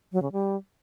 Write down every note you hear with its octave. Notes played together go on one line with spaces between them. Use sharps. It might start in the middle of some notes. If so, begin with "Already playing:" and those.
F#3
C#3
G3